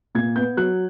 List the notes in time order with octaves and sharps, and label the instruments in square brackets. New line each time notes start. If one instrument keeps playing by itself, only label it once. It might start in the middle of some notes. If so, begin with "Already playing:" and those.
[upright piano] A#2 G#6
B3 G6
F#3 F#6